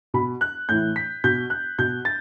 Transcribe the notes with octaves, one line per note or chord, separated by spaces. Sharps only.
B2 B5
F#6
A2 E3 G6
B6
B2 G6
F#6
B2 G6
A6